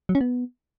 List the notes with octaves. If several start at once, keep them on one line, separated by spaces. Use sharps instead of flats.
F#3
C#4
B3